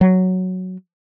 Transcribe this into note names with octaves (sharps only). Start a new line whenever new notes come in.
F#3